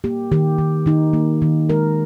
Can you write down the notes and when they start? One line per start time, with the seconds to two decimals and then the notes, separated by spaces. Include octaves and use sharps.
0.04 A#3 G4
0.32 D#3 G4
0.58 D#3
0.86 D#3 D#4
1.13 A#3
1.42 D#3
1.69 G#3 A#4